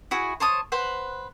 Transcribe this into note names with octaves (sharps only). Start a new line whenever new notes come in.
E4 F#4 G#4
C5 C#5 A5 D#6
B4 C5 F#5